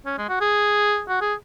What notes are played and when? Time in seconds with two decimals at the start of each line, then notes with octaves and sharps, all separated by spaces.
0.06 C#4
0.18 G#3
0.29 F#4
0.41 G#4
1.09 F#4
1.21 G#4